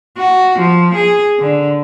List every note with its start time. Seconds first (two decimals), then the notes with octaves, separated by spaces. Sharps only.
0.17 F#4
0.59 F3
0.94 G#4
1.39 D3